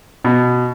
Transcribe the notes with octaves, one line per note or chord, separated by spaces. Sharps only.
B2